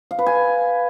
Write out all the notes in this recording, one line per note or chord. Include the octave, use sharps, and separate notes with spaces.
F5
B4
G#5